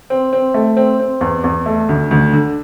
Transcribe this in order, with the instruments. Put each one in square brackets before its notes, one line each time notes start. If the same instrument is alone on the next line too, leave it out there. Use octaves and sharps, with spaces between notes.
[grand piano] C4
C4
A3
C4
C4
E2
E2
A3
D2
D2
D3